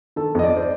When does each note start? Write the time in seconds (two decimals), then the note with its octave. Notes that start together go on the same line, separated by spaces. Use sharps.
0.16 D#3 A4
0.35 F2 D#5
0.44 D5
0.56 C5